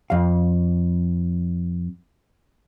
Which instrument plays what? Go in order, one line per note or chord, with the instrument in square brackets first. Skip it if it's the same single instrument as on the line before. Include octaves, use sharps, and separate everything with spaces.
[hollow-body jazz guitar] F2 F5